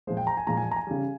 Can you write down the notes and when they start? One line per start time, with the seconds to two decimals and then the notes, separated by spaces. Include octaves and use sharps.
0.07 A#2 F3 G#3 C5
0.17 G5
0.27 A#5
0.37 G#5
0.47 A#2 F3 G#3 A#5
0.57 G#5
0.71 A#5
0.76 G#5
0.87 C#3 G3